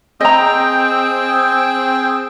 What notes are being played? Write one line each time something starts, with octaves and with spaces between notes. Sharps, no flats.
C4 G#4 D#5 G5 A#5